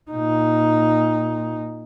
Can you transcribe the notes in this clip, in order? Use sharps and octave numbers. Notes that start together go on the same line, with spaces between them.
A#2 D#4